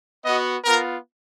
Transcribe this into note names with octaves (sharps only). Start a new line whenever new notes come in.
B3 F#4 D#5
B3 F4 A#4